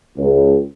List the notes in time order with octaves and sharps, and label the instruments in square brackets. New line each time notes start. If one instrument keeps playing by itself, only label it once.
[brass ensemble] C#2